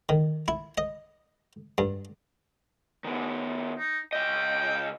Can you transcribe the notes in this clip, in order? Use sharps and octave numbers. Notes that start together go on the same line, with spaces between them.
D#3
E4
D#5
G2
D#3 B3
D#4
C#2 D#5 G5